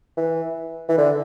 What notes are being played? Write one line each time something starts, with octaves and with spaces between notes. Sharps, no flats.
E3
E3
D3